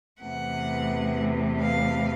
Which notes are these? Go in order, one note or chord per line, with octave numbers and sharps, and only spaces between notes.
E2 C3 E3 A3 F#5
F5